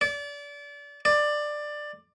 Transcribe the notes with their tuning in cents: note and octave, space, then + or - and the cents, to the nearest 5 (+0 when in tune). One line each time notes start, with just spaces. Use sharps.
D5 -30
D5 +15